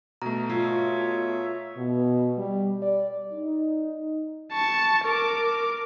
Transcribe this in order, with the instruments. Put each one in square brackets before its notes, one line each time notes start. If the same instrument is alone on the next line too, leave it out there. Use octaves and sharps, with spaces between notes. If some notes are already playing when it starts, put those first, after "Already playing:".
[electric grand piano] B2 A3 [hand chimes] A#5
[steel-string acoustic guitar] F4 [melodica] C#5 E5
[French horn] B2
G3
D5
[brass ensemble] D#4
[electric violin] A5 C#6
A#4 D6